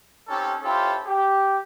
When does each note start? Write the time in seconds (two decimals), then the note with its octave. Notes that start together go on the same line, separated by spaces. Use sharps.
0.28 C4 C#4 D#4 G4 A4
0.63 C#4 E4 F4 G4 A4 C5
1.05 G4